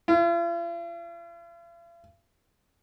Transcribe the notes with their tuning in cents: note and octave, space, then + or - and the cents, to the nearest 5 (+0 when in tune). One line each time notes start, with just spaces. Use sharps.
F4 -45